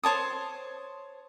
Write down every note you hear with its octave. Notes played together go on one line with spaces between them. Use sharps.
C5 C#5 A5 D#6